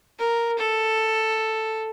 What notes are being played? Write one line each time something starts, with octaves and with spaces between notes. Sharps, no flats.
A#4
A4